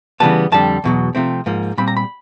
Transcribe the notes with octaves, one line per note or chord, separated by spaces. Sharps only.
C#3 E3 G3 B3 A5
F2 D3 G3 A5
E2 B2 F#3
C3 F3 A3 C4
G#2 F3 A#3
A#2 G3 C4 B5
A#5
B5